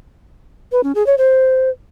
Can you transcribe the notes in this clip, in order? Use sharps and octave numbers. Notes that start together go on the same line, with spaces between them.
B4
C#4
G#4
C#5
C5